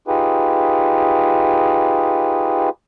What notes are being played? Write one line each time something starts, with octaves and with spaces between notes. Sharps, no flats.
D#4 F4 G4 G#4 B4